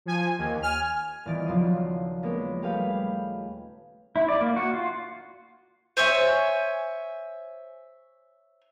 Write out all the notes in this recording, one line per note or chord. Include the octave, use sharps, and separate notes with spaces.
F3 G#5
D#2
G#5 F6
D#1 E3 B3 A6 D7
D#1 C#3 F3 F#3 C6 D#7
G#3 A#3 B3 C#4
G3 A3 G4 G#4 B4 F5
E4
D5
A#3
F#4
F4
C5 C#5 E5 G#5